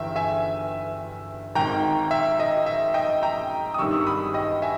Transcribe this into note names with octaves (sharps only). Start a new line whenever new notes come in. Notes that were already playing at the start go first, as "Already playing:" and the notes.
Already playing: G1 G2 E3 E5 G5
E5 G#5
G#1 G#2 D#3 G5 A#5
E5
D#5
E5
D#5 G5
G5 A#5
D#6
G#1 G2 D#3 G3 C#6 E6
C#6
B5 D#6
D#5 G5
E5 G#5